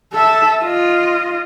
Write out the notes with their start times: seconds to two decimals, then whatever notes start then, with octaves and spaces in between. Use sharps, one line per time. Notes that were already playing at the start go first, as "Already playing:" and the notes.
0.13 A4 E5
0.63 F4 D#5